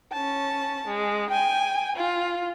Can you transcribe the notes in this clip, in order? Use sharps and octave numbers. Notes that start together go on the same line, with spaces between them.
C#4 A5
G#3
G5 G#5
F4